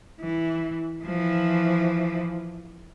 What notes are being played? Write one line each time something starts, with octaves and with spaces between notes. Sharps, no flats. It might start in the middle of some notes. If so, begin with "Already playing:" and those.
E3
E3 F3